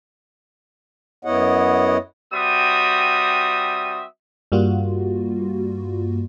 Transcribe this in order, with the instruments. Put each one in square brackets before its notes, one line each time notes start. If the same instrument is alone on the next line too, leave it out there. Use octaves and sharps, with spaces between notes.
[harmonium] F#2 B3 E4 C#5 D#5 F#5
[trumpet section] G3 C4 F#4 E5 D#6
[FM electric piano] G2 G3 A#3 F4 F#4